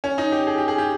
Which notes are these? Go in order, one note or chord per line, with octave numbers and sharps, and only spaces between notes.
C#4
D#4
G4
G#4
G4
G#4
G4